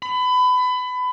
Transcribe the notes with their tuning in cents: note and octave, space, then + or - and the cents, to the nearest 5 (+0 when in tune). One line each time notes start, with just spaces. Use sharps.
B5 +25